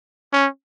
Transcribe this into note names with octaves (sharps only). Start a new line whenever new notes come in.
C#4